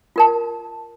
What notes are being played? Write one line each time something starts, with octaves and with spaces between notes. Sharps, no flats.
F4 A#4 A5